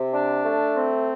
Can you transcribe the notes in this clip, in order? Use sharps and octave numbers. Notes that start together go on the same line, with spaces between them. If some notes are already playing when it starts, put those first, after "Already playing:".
Already playing: C3
D4
A3
C4